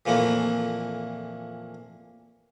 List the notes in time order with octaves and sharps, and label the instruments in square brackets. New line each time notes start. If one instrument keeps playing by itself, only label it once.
[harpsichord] F2 A#2 E3 A3 A#3